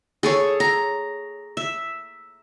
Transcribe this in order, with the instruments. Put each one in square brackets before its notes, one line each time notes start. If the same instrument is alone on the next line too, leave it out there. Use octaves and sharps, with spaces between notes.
[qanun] G#4 A4 C#5
A#5
E5